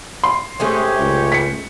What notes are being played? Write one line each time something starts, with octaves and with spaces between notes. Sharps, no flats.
C6
C3 G#3 A3 C#4 G4 C#5
C#2
B6 C#7